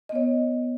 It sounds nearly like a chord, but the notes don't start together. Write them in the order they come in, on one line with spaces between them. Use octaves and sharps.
D#5 B3 C#5